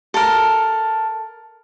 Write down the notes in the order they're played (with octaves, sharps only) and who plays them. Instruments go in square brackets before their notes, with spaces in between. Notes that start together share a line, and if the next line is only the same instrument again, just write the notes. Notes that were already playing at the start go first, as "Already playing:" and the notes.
[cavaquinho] A4 A#4